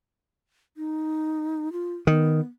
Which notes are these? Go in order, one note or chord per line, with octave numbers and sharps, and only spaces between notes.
D#4
F4
D#3 B3